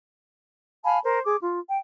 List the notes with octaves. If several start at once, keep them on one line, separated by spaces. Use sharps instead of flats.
F5 G#5 A5 B5
A#4 C5
G#4 D6
F4
G5